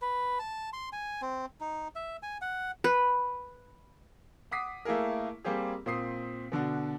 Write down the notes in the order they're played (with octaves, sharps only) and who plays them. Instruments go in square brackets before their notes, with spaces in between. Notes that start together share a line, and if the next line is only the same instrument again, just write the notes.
[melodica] B4
A5
C6
G#5
C4
D#4
E5
G#5
F#5
[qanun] B4
[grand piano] F#5 D6 D#6 B6 C7
A3 A#3 E4 G#4 A#4
G3 A#3 C4 G4 G#4
A#2 C4 D#6 C7
B2 D3 D4 F#4